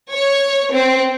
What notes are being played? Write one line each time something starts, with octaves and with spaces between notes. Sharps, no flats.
C#5
C4